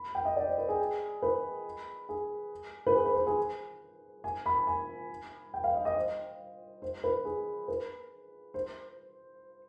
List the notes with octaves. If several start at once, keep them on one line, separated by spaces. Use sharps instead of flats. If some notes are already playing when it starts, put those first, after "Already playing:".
Already playing: B5
G5
D#5
D5
C5
B4
G#4
B4
G#4
B4
G#4
B4
C5
G#4
G#5
B5
G#5
G5
F5
D#5
D#5
C5
C5
B4
G#4
B4
C5